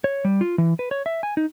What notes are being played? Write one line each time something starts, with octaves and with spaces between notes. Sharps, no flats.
C#5
G3
F4
E3
B4
C#5
E5
G#5
D#4